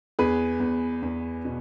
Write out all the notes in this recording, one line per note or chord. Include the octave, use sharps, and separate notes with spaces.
E2 G#4 B4
E2
E2
B2